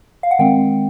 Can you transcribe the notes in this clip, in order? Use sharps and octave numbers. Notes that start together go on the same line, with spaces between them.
F5
F#5
D#3 G#3 C4 G5